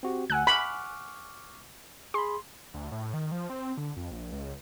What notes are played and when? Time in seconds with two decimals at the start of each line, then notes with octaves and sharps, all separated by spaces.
0.03 C4 F#4 G4
0.30 D2 F#5 G#5 E6 F#6
0.47 B5 C#6 D6 F6
2.14 G#4 B5 C6
2.74 D2
2.92 A2
3.13 D#3
3.32 F3
3.50 C4
3.77 D3
3.97 F2
4.11 A#1
4.32 C#2